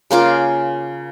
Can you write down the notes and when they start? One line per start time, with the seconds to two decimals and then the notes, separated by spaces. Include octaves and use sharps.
0.11 C#3 A#3 F4 D6